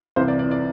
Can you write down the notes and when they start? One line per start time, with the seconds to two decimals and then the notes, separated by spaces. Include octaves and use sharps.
0.16 C2 C3 E3 C5
0.28 D5
0.39 D5
0.51 D5